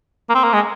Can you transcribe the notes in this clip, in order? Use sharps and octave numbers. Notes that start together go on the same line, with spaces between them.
A#3
C4
A#3
G#3